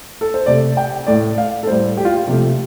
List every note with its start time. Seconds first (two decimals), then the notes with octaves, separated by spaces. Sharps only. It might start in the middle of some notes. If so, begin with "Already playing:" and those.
0.21 A4
0.34 C5
0.46 C3 A3 D5
0.77 G5
1.07 A2 A3 D5
1.38 F5
1.63 A4
1.67 A2 G3 C5
1.97 G4
2.05 F4
2.13 G4
2.28 C3 F3 A3 G4